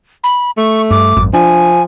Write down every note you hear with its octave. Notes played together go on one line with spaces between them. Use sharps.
B5
A3 C#6
G2 D6
G#1 F#2
F3 D4 G#5